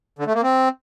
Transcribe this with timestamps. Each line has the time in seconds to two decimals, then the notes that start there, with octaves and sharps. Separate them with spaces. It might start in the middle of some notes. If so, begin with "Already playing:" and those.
0.19 D3
0.27 A3
0.35 A#3
0.43 C4